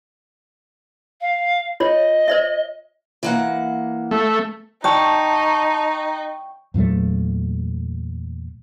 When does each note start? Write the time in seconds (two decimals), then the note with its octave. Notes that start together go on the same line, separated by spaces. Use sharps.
1.21 F5
1.80 F4 C#5 D#5
2.28 C5 D5 E5
3.23 E3 A#3 F#5
4.11 A3
4.84 D#4 G5 A5 C#6
6.74 E2 A#2 F#3 A3